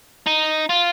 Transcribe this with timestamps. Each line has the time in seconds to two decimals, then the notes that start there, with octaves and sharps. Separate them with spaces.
0.26 D#4
0.69 F4